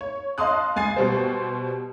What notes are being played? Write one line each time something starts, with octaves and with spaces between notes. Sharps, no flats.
C#5
D#5 F5 A5 C6 D#6 F#6
C#2 G#5 A6 C7
B2 G3 C5